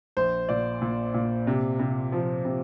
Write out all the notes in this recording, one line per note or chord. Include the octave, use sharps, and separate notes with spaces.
A#1 C5
A#2 D5
A#2
A#2
C3
C3
F3
C3